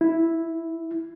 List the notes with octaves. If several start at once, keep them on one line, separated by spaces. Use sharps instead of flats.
E4